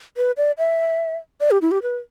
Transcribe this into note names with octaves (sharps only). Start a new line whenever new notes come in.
B4
D5
E5
D5
G4
E4
G4
B4